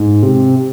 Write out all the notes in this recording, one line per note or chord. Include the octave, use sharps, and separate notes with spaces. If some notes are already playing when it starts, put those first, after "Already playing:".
Already playing: G#2
C3